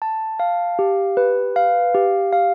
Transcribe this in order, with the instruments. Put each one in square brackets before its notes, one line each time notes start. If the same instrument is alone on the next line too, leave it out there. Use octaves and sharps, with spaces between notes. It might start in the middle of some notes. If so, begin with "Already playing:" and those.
[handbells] A5
F5
G4
B4
F5
G4
F5